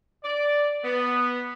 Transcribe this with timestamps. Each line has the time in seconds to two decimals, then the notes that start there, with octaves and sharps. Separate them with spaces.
0.23 D5
0.84 B3